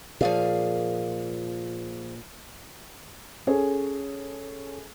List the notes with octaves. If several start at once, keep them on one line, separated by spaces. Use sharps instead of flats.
A#2 F3 G#4 F5
C#4 G#4 A4 C#5 G#5